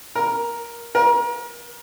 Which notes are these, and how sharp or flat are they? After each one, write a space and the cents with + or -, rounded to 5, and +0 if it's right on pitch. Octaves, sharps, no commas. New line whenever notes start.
A#4 +10
A#4 +35